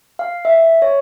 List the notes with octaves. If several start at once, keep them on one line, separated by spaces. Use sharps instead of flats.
F5
E5
C#5